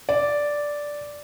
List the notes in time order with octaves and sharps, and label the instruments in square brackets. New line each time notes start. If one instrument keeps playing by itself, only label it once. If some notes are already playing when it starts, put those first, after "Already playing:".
[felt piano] D5